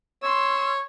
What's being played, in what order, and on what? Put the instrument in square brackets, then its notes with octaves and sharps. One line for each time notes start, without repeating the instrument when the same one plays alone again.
[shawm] C#5 [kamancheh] C6 E6